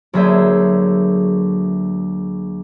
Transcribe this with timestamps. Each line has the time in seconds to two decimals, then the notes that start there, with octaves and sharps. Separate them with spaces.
0.13 D2 F#3 A#3 G#4 E5 G6